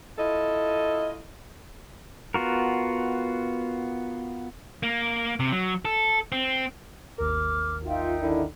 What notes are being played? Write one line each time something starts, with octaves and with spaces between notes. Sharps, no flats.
E4 F4 A4 D#5
B3 F4 F#4 A#4
A#3
C3
F#3
A4
C4
G#1 D#2 A#4 D6 F6
D#4 F4 E5 G5
D3 D#3 E4